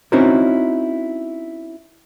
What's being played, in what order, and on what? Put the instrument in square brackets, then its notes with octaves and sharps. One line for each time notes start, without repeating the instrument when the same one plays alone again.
[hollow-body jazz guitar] C4 C#4 D#4 E4 F#4 A#4